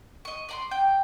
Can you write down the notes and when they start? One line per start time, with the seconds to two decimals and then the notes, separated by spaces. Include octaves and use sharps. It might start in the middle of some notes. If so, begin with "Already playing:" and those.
0.25 D#5 C#6
0.49 D5 A#5 C6
0.71 G5